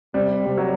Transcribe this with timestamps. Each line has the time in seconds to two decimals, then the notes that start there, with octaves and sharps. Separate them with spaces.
0.14 C3 G3
0.45 C3 G3
0.57 F#3